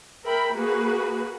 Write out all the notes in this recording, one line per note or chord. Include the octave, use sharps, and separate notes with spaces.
A#4 E5 G5 B5
A#3 F#4 G#4 B4